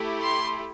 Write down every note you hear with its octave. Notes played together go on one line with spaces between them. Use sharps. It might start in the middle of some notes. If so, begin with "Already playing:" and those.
Already playing: A3 E4 G4
C6